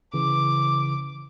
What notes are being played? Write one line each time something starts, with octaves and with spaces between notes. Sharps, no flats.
C#3 E3 D6